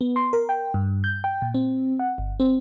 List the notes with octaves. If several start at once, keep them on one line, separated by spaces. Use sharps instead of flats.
B3
C6
A#4
G5
G2
G6
G5
A#2
C4
F#5
G1
C4